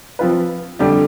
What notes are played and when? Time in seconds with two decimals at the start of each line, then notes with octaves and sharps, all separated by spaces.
0.19 F3 C4 F4 B4
0.79 F2 D3 G3 D4 G4